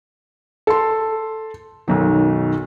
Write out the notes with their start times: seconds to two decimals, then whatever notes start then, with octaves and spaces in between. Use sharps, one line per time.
0.67 A4 C6
1.88 B1 F#2 D#3